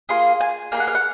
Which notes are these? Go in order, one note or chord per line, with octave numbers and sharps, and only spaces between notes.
A#3 F4 G#4 C6
G#5
A#3 D#4 G#4 F#5 G#5
F5
F#5